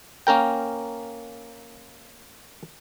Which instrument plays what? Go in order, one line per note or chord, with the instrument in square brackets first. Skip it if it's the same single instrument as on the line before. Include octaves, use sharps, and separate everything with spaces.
[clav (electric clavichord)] A#3 C#4 A#4 G5